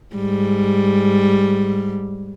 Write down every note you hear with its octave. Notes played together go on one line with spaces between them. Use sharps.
G#2 G3